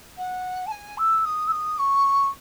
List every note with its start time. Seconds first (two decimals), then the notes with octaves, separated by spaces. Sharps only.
0.17 F#5
0.66 A5
0.71 G#5
0.97 E6
1.24 D#6
1.47 E6
1.51 D#6
1.78 C#6